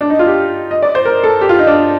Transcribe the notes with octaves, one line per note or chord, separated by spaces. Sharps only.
D4
D#4
F4
G4
D#5
D5
C5
A#4
A4
G4
F4
D#4
D4